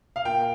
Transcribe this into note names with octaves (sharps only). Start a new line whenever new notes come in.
F5
A#2 G5